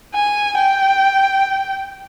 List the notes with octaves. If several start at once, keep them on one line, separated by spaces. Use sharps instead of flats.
G#5
G5